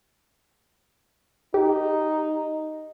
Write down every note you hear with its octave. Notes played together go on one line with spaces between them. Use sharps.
D#4 G4